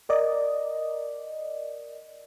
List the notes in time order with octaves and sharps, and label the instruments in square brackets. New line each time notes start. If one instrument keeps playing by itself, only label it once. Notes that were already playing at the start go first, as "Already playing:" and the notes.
[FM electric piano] A#4 D5 D#5